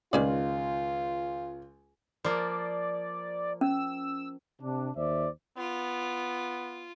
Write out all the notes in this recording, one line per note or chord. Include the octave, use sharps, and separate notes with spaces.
C#2 D#3 C#4 F4 D5
F3 A#3 D5
C#4 E6
C3 D4
D#2 C5 D5 E5
B3 F4